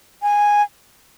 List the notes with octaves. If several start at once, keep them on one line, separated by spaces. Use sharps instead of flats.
G#5